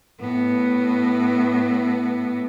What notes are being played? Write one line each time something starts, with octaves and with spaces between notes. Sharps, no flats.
A2 B3